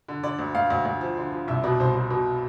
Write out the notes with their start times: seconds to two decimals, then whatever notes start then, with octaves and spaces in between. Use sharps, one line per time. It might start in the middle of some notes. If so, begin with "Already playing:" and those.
0.08 D3
0.24 D3 D5
0.39 D2
0.55 D2 F5
0.70 D2
0.85 D2
1.01 F3
1.17 D3
1.32 F3
1.48 C2 E5
1.63 B2 D5
1.80 C2 C5
1.96 B2
2.10 B2